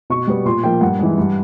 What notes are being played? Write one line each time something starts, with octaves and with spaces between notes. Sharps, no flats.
B2 C#6
G3 B3
A#2 C6
F3 A#3 G5
G2 F#5
E3 G#3
G2